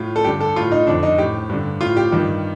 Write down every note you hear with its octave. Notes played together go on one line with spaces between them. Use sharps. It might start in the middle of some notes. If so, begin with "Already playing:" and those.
Already playing: A2 F4
A4
G2 D3 G4
A4
A2 F4
D#4
F2 D3 D4
D#4
A2 G4
G2 D3
A2 F4
G4
G2 D#3